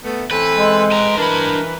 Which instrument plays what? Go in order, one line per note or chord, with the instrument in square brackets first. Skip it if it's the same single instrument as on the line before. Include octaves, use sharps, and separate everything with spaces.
[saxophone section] A3 B3
[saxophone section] E3 C4 A4 [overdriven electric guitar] B4
[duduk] G#3
[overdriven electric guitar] B4 A#5
[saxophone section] E3 B4 [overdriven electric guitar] D4 B5 [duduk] A#4